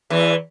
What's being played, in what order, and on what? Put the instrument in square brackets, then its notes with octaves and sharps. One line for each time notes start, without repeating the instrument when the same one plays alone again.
[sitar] E2 E3